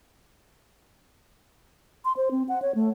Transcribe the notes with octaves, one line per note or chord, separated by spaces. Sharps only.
C6
C5
C4
F#5
C#5
A3